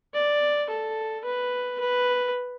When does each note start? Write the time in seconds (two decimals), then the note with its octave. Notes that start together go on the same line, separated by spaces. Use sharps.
0.14 D5
0.70 A4
1.24 B4
1.80 B4